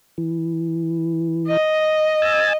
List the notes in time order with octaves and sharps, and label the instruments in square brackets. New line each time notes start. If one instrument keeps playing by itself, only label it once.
[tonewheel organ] E3
[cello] D#5
[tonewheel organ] G#5 E6 A6